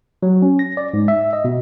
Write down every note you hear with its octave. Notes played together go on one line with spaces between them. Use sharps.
F#3
C#4
A#6
D5
G#2
E5
D#5
B2